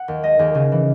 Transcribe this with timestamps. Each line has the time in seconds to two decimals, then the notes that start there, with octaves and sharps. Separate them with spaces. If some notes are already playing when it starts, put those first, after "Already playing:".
Already playing: F#5
0.08 D#2
0.23 G#3 D#5
0.39 D#2 G#4
0.55 C#3 G#4
0.72 E3